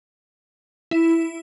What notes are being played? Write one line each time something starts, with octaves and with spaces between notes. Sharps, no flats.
E4